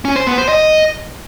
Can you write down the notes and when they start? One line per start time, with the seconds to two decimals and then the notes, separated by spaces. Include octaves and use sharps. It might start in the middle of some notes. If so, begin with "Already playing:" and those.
0.05 C#4
0.16 C5
0.27 B3
0.38 C5
0.49 D#5